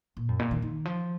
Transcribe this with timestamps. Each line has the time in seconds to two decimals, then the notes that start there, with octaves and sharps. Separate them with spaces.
0.17 A#2
0.29 F#2
0.39 A#2
0.51 D#3
0.62 D#3
0.85 F3